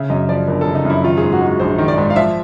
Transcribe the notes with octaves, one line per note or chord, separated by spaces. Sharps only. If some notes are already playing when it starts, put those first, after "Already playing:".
Already playing: C#3 E5
F#2 D#5
F3 D5
G1 A#4
A4
C#3
D#4
F#2 E4
D#3 F4
G#2 G#4
F#4
G#3
F#4
A#1 C5
D#3
D5
G#2
F5
F3 E5